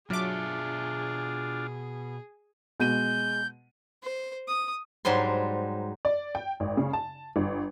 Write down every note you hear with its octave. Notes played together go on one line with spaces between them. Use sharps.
B2 F#3 D4 F4 G#4 E5 A5 D6
B2 G#3 G6 D#7
C5
D#6
G#2 F#3 G3 C5 C6
D5
G5
G#1
C#3
A5
G1